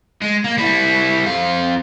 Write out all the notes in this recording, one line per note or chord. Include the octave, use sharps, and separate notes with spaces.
G#3
A#3
G3 E4
F2 F4